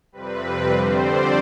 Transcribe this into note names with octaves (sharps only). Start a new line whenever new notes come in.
F2 C3 G3 C4 B4
F2 D3 G3 C4 C5
D5